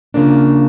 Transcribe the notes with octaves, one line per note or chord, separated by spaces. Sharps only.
C#3 F3 A#3 D4